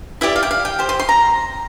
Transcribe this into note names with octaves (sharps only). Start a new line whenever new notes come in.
E4 G4 D5 E5
F5
G5
F5
G5
G4 C5
C6
C6
A#5